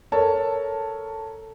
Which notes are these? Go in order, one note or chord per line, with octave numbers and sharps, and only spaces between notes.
A4 A#4 C#5 A5